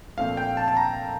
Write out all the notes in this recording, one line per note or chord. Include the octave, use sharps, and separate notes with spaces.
A#1 A#2 A3 C4 F5
G5
A5
A5
A#5